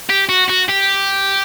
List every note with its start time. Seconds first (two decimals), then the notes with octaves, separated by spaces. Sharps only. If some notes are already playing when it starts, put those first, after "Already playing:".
0.10 G4
0.29 F#4
0.50 F#4
0.70 G4